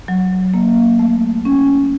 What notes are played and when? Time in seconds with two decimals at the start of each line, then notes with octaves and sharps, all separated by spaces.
0.08 F#3
0.54 A#3
0.99 A3
1.45 C#4